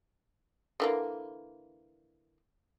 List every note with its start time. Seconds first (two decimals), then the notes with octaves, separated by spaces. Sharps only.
0.80 D3 E3 A#3